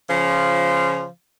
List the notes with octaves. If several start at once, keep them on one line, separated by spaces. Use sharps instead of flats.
C#3 F3